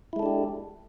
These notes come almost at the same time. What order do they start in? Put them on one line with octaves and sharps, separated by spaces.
E4 G#3 A4 D4 G4